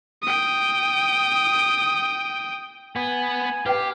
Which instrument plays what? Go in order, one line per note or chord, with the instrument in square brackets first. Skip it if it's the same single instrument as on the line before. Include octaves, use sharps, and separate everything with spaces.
[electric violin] G5 D#6
[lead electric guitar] B3 B4 [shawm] G#5
[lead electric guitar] G4 [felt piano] B4 G5 [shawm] F5